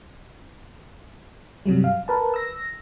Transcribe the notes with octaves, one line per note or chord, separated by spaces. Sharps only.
G2 C3 F#3 G3
F5
A#4 B4 A5
E6 A#6